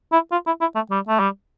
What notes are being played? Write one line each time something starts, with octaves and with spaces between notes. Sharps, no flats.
E4
F4
E4
E4
A3
G3
A3
G3